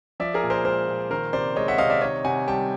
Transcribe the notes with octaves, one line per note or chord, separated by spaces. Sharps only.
F3 D5 E5
G#4 A#4
A#2
A#4 C5
G#3 A#4 C5
A#2
D#3 A#4 C5
C3 C5 D5
G#3 C#5 D#5
E5 F#5
C3 D#5 F5
D5 E5
D#3 C#5 D#5
C3 F#5 G#5
G3 G5 A5